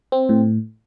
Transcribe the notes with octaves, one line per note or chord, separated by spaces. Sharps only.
C4
A2